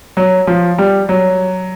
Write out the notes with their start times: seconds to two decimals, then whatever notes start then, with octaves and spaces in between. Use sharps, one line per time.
0.17 F#3
0.47 F3
0.78 G3
1.09 F#3